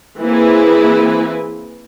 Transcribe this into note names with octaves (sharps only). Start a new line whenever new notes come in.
E3 A#3 C4 E4 G#4 B4